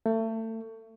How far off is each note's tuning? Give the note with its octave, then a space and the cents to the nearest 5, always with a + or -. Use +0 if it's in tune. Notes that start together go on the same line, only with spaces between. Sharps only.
A3 +30